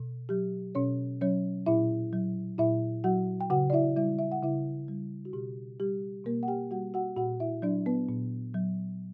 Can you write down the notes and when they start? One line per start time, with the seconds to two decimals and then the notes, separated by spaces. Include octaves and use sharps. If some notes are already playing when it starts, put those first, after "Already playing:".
Already playing: B2
0.29 F#3 G4
0.75 B2 C#4 C#5
1.21 F#3 C#4 C#5
1.66 A#2 E4 E5
2.13 F#3
2.58 A#2 E4 E5
3.04 F#3 F#4 F#5
3.41 G5
3.50 C#3 F#4 F#5
3.70 D5
3.73 E4 E5
3.96 G3 E4 E5
4.19 E5
4.32 F#5
4.43 C#3 E4 E5
4.88 G3
5.25 F#4
5.33 B2 G4
5.80 G3 G4
6.25 B2 A#3 A#4
6.43 F#5
6.48 G4 G5
6.71 G3 F#4 F#5
6.94 F#4 F#5
7.17 A#2 F#4 F#5
7.40 E4 E5
7.62 F#3 D4 D5
7.86 B3 B4
8.09 A#2
8.54 F#3